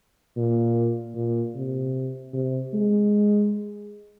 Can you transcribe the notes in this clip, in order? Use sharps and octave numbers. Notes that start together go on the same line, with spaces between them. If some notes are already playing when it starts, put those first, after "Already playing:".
A#2
A#2
C3
C3
G#3